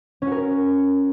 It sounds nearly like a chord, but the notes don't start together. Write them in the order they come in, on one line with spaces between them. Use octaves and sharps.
C#4 F#4 A#4